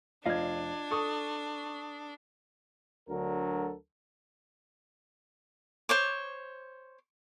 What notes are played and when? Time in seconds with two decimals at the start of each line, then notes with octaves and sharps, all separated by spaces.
0.26 F1 D4 F4 D#5 F5 G#6
0.91 A4 C#6 D#6
3.10 D2 D3 F#3 A4 A#4
5.89 C5 C#5 D6